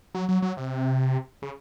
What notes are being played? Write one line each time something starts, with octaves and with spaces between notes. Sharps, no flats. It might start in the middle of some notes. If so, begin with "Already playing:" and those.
F#3
F#3
F#3
C3
C#3